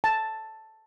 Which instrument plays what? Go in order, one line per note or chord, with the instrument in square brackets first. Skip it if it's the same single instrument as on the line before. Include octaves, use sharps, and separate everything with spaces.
[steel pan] A5